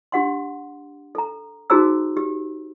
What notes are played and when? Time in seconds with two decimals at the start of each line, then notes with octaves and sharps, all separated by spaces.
0.12 D4 G4 F#5 C6
1.15 A4 A#5
1.70 D#4 F#4 G#4 C5 A#5 E6
2.17 G4